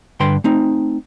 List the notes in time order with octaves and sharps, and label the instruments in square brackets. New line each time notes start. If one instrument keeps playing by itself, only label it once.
[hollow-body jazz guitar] G2 D3 B4 G5 C6
A3 C4 D#4